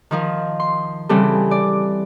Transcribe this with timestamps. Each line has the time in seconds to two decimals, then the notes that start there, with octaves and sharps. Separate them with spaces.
0.11 D#3 F3 A#4
0.60 C6
1.09 C#3 E3 G3 C4 G#4 A4
1.51 D5